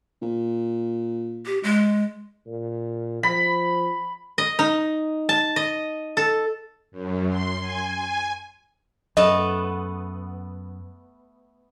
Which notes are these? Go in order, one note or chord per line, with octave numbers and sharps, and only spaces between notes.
A#2
G4
G#3
A#2
F3 B5
D#5
D#4
A5
D#5
A4
F#2
C6
G#5
G#5
F#2 A3 B3 D#5